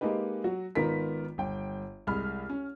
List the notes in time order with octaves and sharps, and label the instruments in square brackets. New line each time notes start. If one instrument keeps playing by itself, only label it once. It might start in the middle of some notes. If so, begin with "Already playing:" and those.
[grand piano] G#3 A#3 D#4 G4 B4
F#3 F#4
G#1 D#3 B3 F4 A#4 B6
G1 G5
C2 G#3 B5 F6
C#4